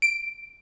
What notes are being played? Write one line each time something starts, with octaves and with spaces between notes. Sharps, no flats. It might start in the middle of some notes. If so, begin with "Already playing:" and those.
D7